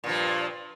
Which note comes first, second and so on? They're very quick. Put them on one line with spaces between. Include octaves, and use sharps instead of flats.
A#2 G2 F3